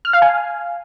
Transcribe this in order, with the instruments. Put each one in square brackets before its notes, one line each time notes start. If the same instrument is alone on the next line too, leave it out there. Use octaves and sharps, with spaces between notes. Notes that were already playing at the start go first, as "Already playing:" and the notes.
[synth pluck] F6
F5
G#5